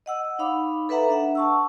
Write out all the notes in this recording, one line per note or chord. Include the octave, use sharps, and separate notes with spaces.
D#5 F#5 E6
D#4 C#5 F5 B5 D6
A4 B4 E5 F#5 A#5
D4 E5 F#5
A5 C#6 E6